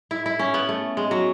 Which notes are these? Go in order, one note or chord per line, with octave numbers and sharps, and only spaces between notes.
E4
E4
C#4
B3
A3
G#3
F#3